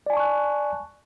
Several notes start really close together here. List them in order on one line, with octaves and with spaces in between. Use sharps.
D5 G#5 A5 C#6 F#6